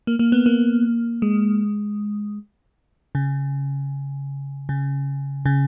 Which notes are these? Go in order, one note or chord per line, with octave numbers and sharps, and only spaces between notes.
A#3
A#3
B3
A#3
G#3
C#3
C#3
C#3